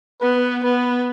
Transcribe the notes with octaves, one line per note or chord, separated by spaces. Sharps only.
B3 B4
B3 B4